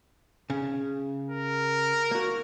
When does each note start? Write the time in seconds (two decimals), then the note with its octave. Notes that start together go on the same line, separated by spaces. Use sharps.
0.50 C#3
1.31 A#4
2.11 A#3 F#4